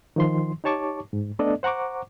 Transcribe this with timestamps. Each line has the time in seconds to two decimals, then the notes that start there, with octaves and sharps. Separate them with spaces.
0.16 D#3 F3 C6
0.64 D#4 G4 C#5 A5 C#6 D6
1.13 G#2
1.39 A3 B3 D4 A4 D5 D#5
1.63 C5 F#5 A#5 C#6 D6